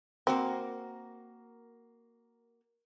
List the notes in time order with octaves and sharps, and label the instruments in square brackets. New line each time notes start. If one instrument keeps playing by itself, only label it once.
[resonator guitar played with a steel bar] A#3 F#4 A#4 [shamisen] C4